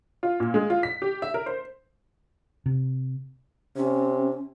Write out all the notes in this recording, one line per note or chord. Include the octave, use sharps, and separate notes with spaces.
F4
A#2
G#3
F4
B6
G4
E5
A#4
C5
C3
C3 C#4